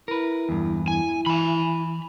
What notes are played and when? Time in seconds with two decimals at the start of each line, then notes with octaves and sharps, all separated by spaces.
0.08 E4 A#4 B4
0.49 E2 G2
0.88 E4 G#5
1.26 E3 G#5 B5